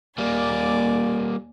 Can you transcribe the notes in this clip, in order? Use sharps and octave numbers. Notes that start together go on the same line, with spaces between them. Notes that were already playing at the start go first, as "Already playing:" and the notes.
D#2 G3 A#3 D5 G#5